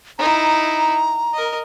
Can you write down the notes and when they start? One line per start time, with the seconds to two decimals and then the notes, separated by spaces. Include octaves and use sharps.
0.19 D#4 E4 A#5
1.33 A#4 D#5